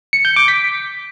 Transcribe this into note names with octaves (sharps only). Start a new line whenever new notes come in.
C#7
G6
D6
B6